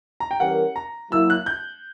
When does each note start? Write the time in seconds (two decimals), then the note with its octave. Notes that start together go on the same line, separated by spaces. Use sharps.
0.20 A#5
0.31 G5
0.40 E3 G3 C#4 G4 A#4 F#5
0.76 A#5
1.11 F#3 A#3 E4 E6
1.30 F#6
1.46 G6